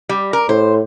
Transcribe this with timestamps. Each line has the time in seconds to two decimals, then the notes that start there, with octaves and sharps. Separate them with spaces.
0.09 G3
0.33 A#4
0.49 A2 C5